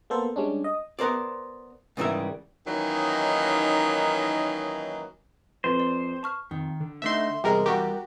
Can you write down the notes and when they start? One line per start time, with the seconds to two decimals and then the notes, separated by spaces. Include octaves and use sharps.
0.10 A#3 B3 A4 C5
0.36 G3 G#3 C#4 D4
0.64 D#5
0.99 B3 A#4 C5 D5
1.97 G#2 C#3 E3 G3 A#4 E5
2.67 D#3 E3 F#3 A#3 C#4 D#4
5.64 F2 B4 C5
5.80 D5
6.23 A5 C#6 F6
6.51 F2 D#3
6.80 D3
7.02 D2 A3 D#4 E5 C6
7.44 E2 C3 G3 G#3 A#4
7.66 G3 F#4 G4 A#4